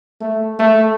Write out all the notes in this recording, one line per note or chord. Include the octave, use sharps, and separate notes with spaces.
A3
A3